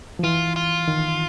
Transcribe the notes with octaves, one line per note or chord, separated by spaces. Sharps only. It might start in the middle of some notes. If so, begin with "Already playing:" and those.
F3
E3 F4
F4
D#3